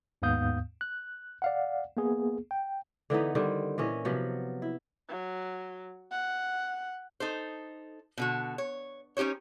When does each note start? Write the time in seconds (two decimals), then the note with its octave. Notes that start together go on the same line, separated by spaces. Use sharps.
0.22 D#2 G#2 B3 F5 D#6 G6
0.81 F#6
1.42 D5 F5 F#5
1.97 A#3 B3 G#4
2.51 G5
3.10 D3 E3 B3 D#4
3.35 D3 D#3 G3 C4
3.78 A#2 E3 C#4 D#5
4.05 C3 F3 F#3 B3
4.62 E4
5.09 F#3
6.11 F#5
7.20 D#4 A4 C5
8.17 B2 D3 F#4
8.58 C#5
9.17 C#4 D#4 G4 C5 C#5